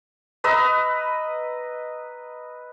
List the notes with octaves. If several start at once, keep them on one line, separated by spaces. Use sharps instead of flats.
B4 D#5 A#5 E6